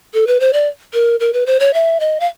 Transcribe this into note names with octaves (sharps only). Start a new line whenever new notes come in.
A4
B4
C5
D5
A#4
A#4
B4
C5
C#5
E5
D#5
F5